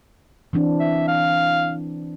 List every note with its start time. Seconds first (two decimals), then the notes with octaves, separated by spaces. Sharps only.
0.53 E3 C4 D4
0.80 E5
1.08 F5